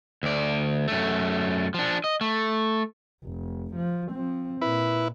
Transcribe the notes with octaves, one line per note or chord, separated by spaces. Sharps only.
D2 D5
F#2 A3
F3 D4
D#5
A3
F1
F3
F3 C4
A#2 E4 B4